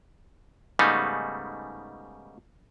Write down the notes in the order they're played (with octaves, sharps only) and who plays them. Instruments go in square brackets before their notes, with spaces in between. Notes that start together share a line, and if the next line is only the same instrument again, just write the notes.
[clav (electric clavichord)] G#2 C#3 G3 A3 B3 D#4